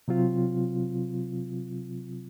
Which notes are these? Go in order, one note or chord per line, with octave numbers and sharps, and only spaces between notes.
C3 F#3 C4 F4